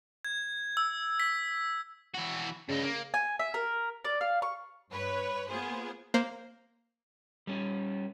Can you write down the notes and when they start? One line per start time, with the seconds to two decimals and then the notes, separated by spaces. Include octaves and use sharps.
0.25 G#6
0.77 E6
1.20 B6
2.14 E3 F#4
2.69 G2 C#3 D#4
2.83 A#3
3.14 G#5
3.39 E5
3.54 A#4
4.05 D5
4.21 F5
4.42 C#6
4.91 G2 B4 C#5
5.49 A#3 B3 F4 G#4 C5
6.14 A#3 C5
7.47 G3 C#4